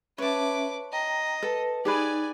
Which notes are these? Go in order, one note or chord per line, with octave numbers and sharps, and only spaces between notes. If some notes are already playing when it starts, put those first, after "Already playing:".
C#4 B4 C#5 E5 A5 D6
D#5 G5 A#5
A4 B4
D#4 G4 G#4 B4 D5 G#5